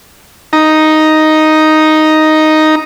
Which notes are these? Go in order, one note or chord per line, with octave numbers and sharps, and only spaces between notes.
D#4 A#5